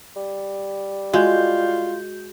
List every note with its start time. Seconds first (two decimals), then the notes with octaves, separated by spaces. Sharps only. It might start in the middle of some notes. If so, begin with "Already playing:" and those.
0.16 G3
1.13 G#3 F4 F#4 G6